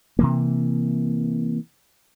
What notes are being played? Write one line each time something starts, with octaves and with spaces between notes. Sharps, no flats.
C3 E3 A#3